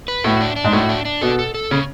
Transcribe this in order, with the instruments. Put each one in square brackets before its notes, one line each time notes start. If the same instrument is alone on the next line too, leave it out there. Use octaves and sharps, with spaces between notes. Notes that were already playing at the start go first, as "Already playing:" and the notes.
[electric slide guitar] B4
[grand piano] A2 [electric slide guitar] F#4
[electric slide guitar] D4
D4
[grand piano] G#2
[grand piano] A2 [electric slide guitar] F#4
[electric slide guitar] D4
D4
[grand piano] B2 [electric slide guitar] A4
[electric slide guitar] A4
A4
[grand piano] C#3 [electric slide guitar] C#4